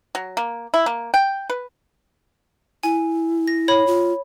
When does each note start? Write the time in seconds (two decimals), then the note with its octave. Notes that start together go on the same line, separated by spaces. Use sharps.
0.15 F#3
0.37 A#3
0.74 E4
0.86 A#3
1.14 G5
1.50 B4
2.83 E4 G#5
3.48 A#6
3.68 C#5 B5
3.87 F4